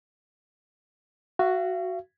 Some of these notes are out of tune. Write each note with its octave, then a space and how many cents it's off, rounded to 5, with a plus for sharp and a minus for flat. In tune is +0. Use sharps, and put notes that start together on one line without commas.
F#4 +0 F5 -45